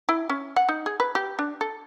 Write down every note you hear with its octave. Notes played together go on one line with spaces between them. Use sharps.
E4
C#4
F#5
D#4
G#4
B4
G4
D4
A4